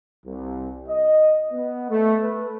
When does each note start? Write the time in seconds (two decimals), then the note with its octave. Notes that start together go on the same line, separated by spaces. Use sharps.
0.26 C2
0.88 D#5
1.53 B3
1.90 A3
2.23 B4